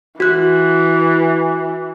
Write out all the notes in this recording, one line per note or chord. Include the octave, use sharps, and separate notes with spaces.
E3 F#4 F#6